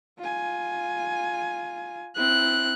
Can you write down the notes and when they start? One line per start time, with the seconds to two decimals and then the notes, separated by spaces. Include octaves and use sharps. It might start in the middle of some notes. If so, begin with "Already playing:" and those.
0.19 F4 G#5
2.17 C4 E4 F#6